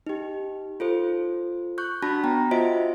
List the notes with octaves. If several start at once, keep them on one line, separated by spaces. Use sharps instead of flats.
D#4 G4
F4 A4 C5
C#6 F#6 G6
D4 F#4 A5 B5 A#6
B3 G5 A#5
F4 F#4 C5 D#5 E5 D7